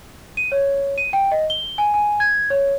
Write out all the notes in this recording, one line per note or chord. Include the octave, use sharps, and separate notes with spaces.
D#7
C#5
D#7
G5
D#5
G7
G#5
G#5
G#6
C#5